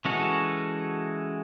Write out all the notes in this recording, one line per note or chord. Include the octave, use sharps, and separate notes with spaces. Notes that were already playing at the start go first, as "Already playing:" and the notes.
E3 G#3 C#4 F#4 A4